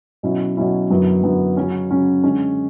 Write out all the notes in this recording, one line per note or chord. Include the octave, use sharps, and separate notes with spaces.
B2 F#3 C#4 E4
B2 F#3 C#4 E4
F#2 D3 F#3 B3 E4
F#2 D3 F#3 B3 E4
C#3 F#3 C#4
C#3 F#3 C#4
D3 G#3 C#4